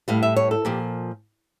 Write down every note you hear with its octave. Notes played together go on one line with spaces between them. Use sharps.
A2 G3 F5
E5
C#5
A4
A#2 F3 G4